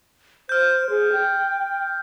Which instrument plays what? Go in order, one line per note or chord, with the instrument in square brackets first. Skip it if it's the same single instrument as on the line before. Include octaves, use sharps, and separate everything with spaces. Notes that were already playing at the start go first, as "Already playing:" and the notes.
[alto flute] C5 [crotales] F6 G6
[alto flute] G#4
G5